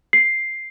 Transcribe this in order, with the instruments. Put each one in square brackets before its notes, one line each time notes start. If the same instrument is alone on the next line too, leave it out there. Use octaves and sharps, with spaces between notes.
[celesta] C7